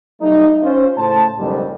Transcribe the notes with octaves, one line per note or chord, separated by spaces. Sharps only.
F#3 G3 A3 D#4
C#4 F4 C5
A2 C#3 C5 A5
F#1 B1 F2 G#2 G3 C4